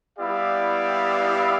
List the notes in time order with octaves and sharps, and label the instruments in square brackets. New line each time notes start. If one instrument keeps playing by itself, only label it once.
[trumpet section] G3 B3 E4 G4 D5 F5